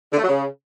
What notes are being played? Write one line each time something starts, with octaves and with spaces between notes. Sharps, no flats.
D3
A3
F#3
C#3